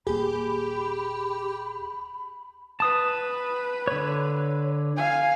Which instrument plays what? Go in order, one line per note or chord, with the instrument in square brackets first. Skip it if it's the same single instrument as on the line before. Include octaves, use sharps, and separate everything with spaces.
[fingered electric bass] D#1 A#3 [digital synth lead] G4 [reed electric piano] G#4 [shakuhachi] B5
[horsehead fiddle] B4 [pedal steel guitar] A5 D#6
[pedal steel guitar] D3 C#5
[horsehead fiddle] F5 G#5